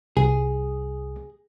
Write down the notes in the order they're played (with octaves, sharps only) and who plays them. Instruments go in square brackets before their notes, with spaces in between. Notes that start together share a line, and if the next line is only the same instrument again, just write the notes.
[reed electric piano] C2 [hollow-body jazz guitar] G#4